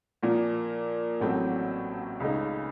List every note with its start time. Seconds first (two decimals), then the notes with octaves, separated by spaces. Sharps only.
0.23 A#2 F3 A#3
1.20 A1 A2 F#3 A3 C4
2.20 C#2 C#3 A3 D#4